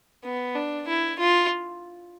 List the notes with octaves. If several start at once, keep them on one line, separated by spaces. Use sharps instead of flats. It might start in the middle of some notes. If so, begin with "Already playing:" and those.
B3
D4
E4
F4